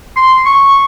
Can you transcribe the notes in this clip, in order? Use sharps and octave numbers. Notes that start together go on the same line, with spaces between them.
C6
C#6